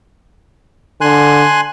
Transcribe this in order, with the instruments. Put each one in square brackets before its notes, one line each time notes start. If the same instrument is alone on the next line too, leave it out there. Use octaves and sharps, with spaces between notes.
[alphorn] D3 [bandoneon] G#5 C6 F#6